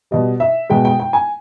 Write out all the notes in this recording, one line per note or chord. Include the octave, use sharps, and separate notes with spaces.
B2 G3 D#5
E5
B2 G#3 G5
G5
G5
G#5